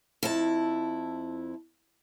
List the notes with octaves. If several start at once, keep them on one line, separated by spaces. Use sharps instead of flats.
F2 E4 A5